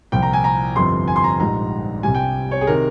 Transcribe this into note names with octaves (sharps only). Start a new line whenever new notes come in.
C2 A#2 F3 G5
A#5
G#5
A#5
G1 F2 C3 F3 C6
G#5
C6
A#5
A#1 G#2 G3 A#5
C2 C3 G3 G#5
G5
C#5
G#4
C3 D#3 A#4